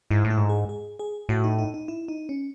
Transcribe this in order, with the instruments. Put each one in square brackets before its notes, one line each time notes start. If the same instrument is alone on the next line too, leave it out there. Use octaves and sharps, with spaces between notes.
[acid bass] G#2 [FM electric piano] E4
[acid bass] A2
[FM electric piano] E4
[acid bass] G#2
[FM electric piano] G#4
G#4
G#4
[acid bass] A2 [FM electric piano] F#4
[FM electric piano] D#4
D#4
D#4
E4
D#4
C#4